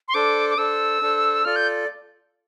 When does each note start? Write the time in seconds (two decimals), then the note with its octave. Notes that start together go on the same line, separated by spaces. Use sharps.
0.08 C6
0.14 D4 A4 C5 D6
0.50 D6
0.58 D4 A4 C5 E6
1.02 D4 A4 C5
1.45 F4 A4 D5 F6
1.56 G6